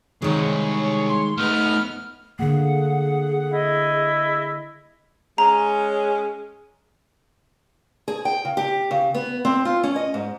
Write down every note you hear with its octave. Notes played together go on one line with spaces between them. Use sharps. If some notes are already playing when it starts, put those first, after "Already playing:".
C2 D#3 G#3 G#4 C#5
C6
A3 B3 D#4 F6
D3 A#3 G#4 F#5
E4 D#5
G#3 C#4 A#5
G#4
G5
C#3
G4
C#3
B3
C4
F4
C#4
D#5
G#2